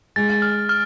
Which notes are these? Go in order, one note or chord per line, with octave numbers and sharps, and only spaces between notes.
G#3 A6
F6
F6